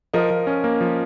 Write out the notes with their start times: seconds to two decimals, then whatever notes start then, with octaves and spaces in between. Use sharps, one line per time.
0.13 F3 A#4 D#5
0.30 F3
0.47 C#4
0.64 A#3
0.81 F3